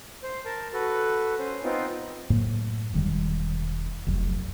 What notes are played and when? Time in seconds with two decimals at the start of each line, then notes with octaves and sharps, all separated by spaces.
0.23 C5
0.45 A#4 A5
0.74 F#4 A4 B4
1.39 C#4 C5
1.64 B3 C4 D#4 F4
2.30 F#2 A2 A#3
2.94 E1 D#3 G3
4.07 F1 C2 F#2